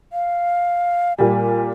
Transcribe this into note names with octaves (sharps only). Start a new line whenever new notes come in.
F5
A#2 G3 G#5